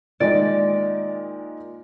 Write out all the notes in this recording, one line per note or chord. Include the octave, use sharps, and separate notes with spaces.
A#2 D#3 G#3 D5